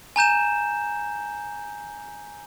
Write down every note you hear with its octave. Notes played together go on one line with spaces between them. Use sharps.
G#5 A#5 G6 E7